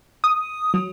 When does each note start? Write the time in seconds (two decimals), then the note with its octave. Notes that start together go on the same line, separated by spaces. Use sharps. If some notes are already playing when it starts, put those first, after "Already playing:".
0.24 D#6
0.74 F#3